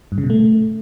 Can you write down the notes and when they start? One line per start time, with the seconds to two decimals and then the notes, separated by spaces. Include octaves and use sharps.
0.12 G2
0.18 C#3
0.24 B2
0.30 A3